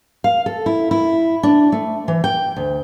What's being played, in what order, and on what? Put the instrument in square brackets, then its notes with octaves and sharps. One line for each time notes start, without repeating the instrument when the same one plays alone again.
[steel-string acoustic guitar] F5
A4
E4
E4
D4
A3
E3
G5
D2